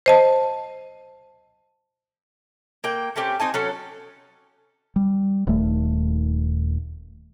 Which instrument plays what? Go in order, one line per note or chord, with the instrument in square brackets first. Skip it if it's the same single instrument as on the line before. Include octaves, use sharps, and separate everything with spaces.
[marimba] C5 D#5 A5
[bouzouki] A#3 G5
A3 C4 C#4 G4
C4 D#4 G#5 A5
F#3 C#4 A4
[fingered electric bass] G3
D#1 D#2 A3